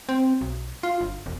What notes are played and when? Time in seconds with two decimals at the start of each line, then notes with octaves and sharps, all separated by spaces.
0.09 C4
0.41 B1
0.83 F4
1.01 G1
1.26 E1